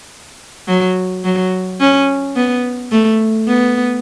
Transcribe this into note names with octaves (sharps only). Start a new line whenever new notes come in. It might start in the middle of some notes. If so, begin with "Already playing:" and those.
F#3
F#3
C#4
B3
A3
B3